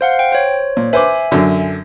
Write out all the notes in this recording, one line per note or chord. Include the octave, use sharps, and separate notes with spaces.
C5 F5 F#5
G5
C5 C#5
A#2
B4 C5 E5 G#5 D6
F#2 D3